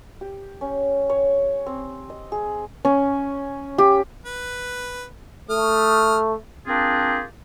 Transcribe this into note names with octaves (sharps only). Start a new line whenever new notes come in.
G4
C#4
C#5
C4
D#5
G#4
C#4
G4
B4
A3 D#6 F6
A#3 C4 D4 F4 G4 G#4